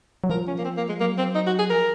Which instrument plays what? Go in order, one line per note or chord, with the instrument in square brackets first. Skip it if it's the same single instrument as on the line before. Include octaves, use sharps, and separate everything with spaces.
[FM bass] F#3
[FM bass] F3 [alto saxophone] A#4
[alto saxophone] C#4
A#3
C4
A#3
G#3
[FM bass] F#3 [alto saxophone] A#3
[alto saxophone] C4
D#4
F#4
G#4
[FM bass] F3 [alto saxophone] A#4